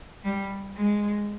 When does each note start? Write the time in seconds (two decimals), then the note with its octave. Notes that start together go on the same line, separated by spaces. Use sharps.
0.24 G3
0.77 G#3